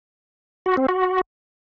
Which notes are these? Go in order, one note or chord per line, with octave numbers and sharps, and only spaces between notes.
F#4
C4
F#4